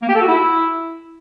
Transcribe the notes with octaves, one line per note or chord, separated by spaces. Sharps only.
A#3
G4
A4
F#4
E4